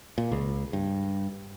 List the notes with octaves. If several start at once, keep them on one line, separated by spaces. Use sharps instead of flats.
A#2
C#2
G2